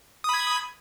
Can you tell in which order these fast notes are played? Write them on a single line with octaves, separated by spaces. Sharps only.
D#6 B5 G#6